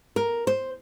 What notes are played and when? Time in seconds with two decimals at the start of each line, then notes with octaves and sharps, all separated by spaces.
0.16 A#4
0.47 C5